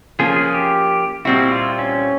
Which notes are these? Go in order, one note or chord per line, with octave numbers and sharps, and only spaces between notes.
F3 A#3 C#4 G#4
G#4
G4
A#2 G3 C4 E4 F#4
F4
C#4